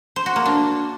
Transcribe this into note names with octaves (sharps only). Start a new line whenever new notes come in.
C5
F#4
A#3
D4